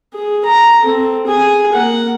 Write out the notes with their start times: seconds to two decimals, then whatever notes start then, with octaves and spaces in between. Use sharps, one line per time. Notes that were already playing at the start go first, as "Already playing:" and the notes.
0.14 G#4
0.45 A#5
0.83 C4 A4
1.27 G#4 G#5
1.72 A#3 F#5